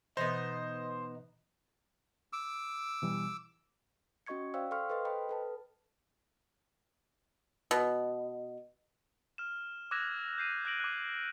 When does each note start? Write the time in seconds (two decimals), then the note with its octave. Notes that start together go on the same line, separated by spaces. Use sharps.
0.17 B2 E3 B3 D#4 C5 D#5
2.33 D6 E6
3.02 B2 E3 G3
4.26 C#4 F#4 D#5 C#6 G#6 C#7
4.54 C5 D5 F5 G5 E6
4.71 A4 F5 G5 C6 C#6 F6
4.90 A4 B4 C5 D#5 C6
5.05 B4 C5 D#5 G5 B5
5.29 A4 B4 A5
7.71 B2
9.38 F6 E7
9.91 D6 E6 F#6 G#6 A#6 E7
10.38 G6 C7 D#7
10.65 F#6 A#6 D7 F#7
10.80 D6 F#6